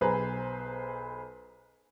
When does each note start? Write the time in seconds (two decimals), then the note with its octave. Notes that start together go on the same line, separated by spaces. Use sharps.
0.01 B1 G#4 B4 C5 A#5